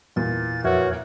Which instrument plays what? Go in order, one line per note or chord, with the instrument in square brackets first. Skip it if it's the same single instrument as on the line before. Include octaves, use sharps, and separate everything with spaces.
[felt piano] E2 A#2 [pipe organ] A6
[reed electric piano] F2 E5 [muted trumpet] F#4 [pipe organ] A#4 B4 C#5